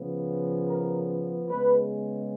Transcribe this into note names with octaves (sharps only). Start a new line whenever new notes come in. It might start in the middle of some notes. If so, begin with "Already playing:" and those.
Already playing: C#3 F3 B3
A#4
C#3 G#3 B3 B4